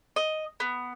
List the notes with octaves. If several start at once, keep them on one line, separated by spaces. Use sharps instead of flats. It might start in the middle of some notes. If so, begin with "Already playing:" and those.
D#5
B3